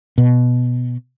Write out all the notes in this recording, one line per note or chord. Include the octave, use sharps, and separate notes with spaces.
B2